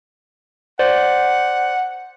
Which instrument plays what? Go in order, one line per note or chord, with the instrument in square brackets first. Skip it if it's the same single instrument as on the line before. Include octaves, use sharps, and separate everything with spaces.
[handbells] C5 D5 [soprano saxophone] F#5